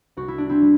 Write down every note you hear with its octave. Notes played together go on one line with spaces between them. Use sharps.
C2 F#4
E4
D4
C4 E4
G3